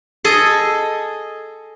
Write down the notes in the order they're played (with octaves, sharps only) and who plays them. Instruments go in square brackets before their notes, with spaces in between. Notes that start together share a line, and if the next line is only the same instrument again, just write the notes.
[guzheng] G#4 A4 D#5